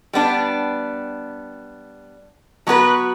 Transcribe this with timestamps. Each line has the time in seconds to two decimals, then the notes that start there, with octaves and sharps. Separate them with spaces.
0.13 G3 B3 D4
2.67 F#3 B3 F#4 B4